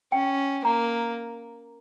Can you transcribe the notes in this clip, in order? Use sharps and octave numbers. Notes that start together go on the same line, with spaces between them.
C#4 G5
A#3 A#5